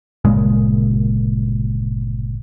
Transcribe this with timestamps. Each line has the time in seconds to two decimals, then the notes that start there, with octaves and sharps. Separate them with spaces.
0.25 G1 A#2 C#3 G#3